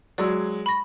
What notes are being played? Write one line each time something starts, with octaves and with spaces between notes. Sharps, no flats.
F#3 G#3 D5 E6
B5 C#6 A#6